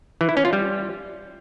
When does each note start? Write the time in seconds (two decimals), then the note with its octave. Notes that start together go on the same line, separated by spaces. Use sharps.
0.21 E3
0.29 E4
0.37 C#4
0.45 F4
0.53 G3